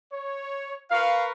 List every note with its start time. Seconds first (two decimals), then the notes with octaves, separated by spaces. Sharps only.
0.11 C#5
0.91 A#4 B4 F5 C#6